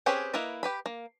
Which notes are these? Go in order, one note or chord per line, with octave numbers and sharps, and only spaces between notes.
C4 C#4 G4 G#4 B4
A#3 E4 A#4 B4 D#5
G4 B4 B5
A#3